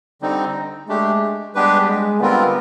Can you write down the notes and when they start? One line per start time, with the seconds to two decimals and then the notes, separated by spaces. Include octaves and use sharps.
0.22 D3 G3 C4 D#4
0.88 G#3 A3 D4 G4
1.55 G3 G#3 B3 D4 G4 B4
1.88 G#3
2.20 D3 G3 B3 C4 F4 A#4